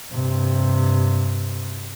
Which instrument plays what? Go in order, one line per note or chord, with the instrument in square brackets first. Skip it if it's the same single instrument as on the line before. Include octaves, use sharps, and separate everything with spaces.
[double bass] G2 C3